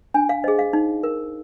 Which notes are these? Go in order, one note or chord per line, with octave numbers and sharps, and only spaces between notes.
D4 G#5
F5
G#4 C5 D#5
F5
D#4
A#4